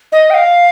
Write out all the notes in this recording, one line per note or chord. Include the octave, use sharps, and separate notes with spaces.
D#5
G5
F5